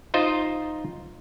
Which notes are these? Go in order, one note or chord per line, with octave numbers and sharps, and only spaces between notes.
D#4 F4 C5 D#5